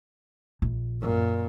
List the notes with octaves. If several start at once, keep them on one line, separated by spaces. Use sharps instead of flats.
A#1
F#2 A#2